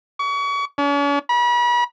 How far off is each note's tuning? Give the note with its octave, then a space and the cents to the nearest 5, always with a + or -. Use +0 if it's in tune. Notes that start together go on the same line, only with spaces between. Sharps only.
C#6 +35
C#4 +45
B5 -40